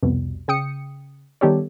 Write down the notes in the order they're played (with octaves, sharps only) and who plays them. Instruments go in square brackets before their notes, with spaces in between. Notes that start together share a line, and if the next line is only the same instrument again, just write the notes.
[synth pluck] C2 F2 B2 G3
C#3 G5 D#6 C#7
D#3 G3 B3 G4 A4 C#5